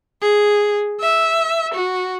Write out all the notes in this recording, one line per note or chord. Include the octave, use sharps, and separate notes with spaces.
G#4
E5
F#4